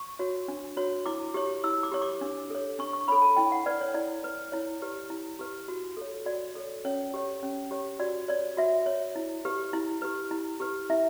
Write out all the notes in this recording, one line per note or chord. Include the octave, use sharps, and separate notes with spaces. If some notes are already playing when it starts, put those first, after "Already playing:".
Already playing: C#6
F#4 C#5
D4
F#4 C#5
E4 D6
G4 C#5
E4 E6
D6
G4 C#5
D6
D4
A4 C#5
D4 C#6
C#6
A4 C#5 B5
A5
E4 G5
F#5
B4 D5
C#5
E4 D5
B4
E4 C#5
G4 B4
E4
G4 B4
F#4
A4 C#5
F#4 D5
A4 C#5
C#4 C#5
G4 C#5
C#4
G4 C#5
F#4 D5
C#5 D5
F#4 E5
C#5
E4
G4 B4
E4
G4 B4
E4
G4 B4
E4 E5